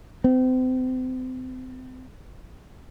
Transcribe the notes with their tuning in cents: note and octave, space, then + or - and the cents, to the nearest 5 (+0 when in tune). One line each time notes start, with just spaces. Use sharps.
C4 -35